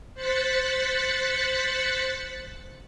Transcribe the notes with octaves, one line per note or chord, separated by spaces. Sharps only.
C5 F#6 A6 B6 C#7